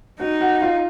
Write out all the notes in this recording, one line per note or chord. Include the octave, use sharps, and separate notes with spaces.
D#4 F#4 F#5
F#4 F#5
F4 F5